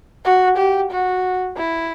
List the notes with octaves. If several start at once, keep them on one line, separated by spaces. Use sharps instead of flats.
F#4
G4
F#4
E4